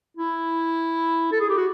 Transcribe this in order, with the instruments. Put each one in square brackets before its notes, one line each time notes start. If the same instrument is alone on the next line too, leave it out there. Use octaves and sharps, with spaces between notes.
[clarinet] E4
A4
G#4
G4
F#4